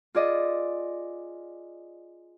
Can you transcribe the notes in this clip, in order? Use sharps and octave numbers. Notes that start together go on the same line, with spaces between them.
F4 G#4 D5 D#5